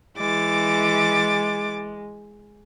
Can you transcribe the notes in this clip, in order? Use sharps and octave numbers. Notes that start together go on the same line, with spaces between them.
E3 G#3 D6 A6